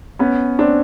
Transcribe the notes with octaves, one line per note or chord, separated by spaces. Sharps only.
B3 C#4
C4 D4